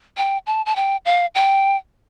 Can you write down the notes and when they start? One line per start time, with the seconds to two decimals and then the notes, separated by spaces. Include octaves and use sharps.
0.17 G5
0.46 A5
0.66 A5
0.76 G5
1.05 F5
1.35 G5